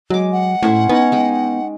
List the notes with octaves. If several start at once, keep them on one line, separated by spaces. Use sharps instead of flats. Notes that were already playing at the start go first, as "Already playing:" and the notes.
F#3 G#3 D6
F#5
A2 C#4 E4 C5
B3 C#4 D#4 C#5
G#3 G5